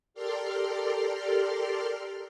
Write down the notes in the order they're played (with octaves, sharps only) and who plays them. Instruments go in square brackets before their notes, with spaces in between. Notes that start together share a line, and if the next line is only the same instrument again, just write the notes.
[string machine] G4 A4 A#4 D5 C6 F6